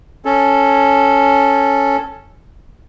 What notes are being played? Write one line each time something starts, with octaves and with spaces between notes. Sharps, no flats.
C#4 A4